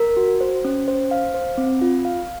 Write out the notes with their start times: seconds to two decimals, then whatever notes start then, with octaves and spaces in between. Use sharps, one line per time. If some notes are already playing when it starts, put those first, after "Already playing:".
Already playing: A#4
0.17 F#4
0.41 C5
0.65 C#4
0.88 C5
1.11 F5
1.34 C5
1.57 C4
1.82 F4
2.05 F5